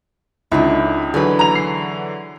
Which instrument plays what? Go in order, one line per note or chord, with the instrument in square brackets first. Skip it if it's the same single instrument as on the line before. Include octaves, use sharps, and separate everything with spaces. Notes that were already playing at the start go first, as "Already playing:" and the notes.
[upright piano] C#2 D#4 [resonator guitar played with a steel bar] D3 F#3 E4
[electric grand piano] D3 E3 F#3 [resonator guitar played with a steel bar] G#4 B4
[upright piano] A#5 F7
C7